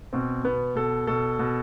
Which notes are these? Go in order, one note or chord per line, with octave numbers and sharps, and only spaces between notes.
B2 C4
B2 B3
B2 A4
B2 A4
B2